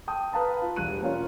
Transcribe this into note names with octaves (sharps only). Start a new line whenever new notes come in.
G5 A5 D#6
B4 F5 A5 A#5
F4
E1 G3 F#6 D#7
A#3 C#4 F4 C#5